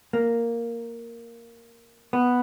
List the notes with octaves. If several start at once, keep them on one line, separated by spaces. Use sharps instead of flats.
A#3
B3